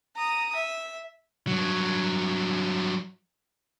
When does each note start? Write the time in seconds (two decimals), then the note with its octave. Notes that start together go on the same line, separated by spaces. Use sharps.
0.16 A#5 D#6
0.56 E5
1.47 G2 F#3